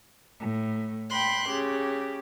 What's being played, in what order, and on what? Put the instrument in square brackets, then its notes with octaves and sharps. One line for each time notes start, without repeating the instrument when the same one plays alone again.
[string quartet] A2
G5 B5 C6 F#6
C#3 G4